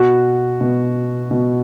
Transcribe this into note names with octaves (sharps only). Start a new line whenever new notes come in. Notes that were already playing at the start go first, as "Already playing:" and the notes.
Already playing: B2 F#4
B2
B2